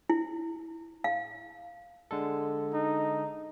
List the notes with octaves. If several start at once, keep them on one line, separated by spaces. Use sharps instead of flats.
E4
F5
D3 G#3 A4
D#4